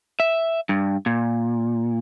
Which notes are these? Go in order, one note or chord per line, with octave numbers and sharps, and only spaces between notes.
E5
G2
A#2